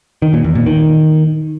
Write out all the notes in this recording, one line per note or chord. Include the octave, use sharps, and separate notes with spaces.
D#3
A#2
E2
A#2
D#3